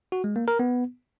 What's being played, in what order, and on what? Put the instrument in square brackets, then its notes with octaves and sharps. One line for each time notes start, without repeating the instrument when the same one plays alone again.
[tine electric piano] F#4
G#3
A#3
A#4
B3